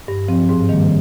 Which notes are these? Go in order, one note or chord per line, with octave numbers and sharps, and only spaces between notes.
G2
F3 C4
G#2
D#3 G3 A#3